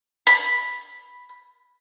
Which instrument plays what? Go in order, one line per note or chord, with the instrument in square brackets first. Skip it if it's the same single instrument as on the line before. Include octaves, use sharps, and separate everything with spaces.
[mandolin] B5